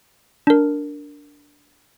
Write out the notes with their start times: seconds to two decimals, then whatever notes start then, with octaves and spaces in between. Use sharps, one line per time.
0.47 D4 A#4